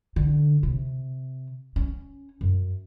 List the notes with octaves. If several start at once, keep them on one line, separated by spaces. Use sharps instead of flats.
D3
C3
C#4
F#2